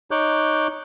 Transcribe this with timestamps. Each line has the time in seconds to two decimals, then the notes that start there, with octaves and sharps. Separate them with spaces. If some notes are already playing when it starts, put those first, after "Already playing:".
0.11 D#4 C#5 D6 F#6 G6